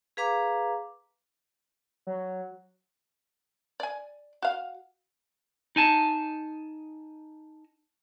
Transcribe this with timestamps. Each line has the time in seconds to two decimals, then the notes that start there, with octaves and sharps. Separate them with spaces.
0.17 G#4 B4 F5 A#5 D6
2.07 F#3
3.80 D5 G#5
4.42 F#4 F5
5.76 D#4 G#5 A5